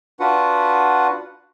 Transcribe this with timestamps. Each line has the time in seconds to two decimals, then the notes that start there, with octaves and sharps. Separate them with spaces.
0.20 D4 F4 F#4 B4 F#5